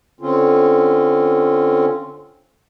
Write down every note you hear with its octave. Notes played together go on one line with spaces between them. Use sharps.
D3 C4 C#4 F4